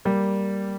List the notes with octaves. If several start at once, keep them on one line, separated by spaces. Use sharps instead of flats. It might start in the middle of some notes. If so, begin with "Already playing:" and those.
G3 A#3